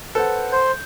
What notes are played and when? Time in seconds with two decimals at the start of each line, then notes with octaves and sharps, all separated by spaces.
0.15 A4 B4 C5 F#5
0.52 C5 G6